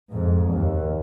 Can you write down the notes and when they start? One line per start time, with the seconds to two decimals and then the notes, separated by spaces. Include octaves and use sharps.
0.12 F2 G#2
0.51 D#2